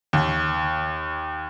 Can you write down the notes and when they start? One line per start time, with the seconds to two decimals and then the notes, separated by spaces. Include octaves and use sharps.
0.13 D#2